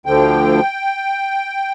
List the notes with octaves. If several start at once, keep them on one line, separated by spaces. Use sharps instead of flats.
D2 D3 F3 G5